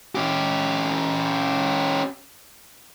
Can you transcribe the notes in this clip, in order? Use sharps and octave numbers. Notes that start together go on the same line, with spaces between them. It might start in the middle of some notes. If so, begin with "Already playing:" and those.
C#4 G4